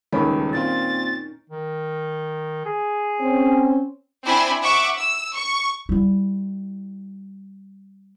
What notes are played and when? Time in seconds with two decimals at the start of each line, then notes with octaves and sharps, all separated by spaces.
0.12 D#1 C#2 D#3 C#4 B5
0.53 A#2 C4 F4 A6
1.50 D#3
2.65 G#4
3.21 C4 C#4
4.26 C4 D4 E4 G#5
4.62 E5 F#5 C#6 D6
4.97 E6
5.34 C#6
5.89 G3 E4